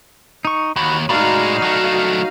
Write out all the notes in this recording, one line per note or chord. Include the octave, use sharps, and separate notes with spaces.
D#4 C#6
D#2 F#4 B5
A2 G#3 D#4 F#4 D5 F5 A#5 B5
F#3 A3